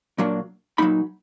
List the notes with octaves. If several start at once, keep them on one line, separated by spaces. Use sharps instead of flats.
A#2 F#3 A#3 D4
A#2 F#3 A#3 D#4 B5